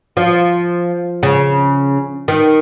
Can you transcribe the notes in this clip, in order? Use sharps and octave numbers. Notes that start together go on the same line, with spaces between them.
F3
C#3
D#3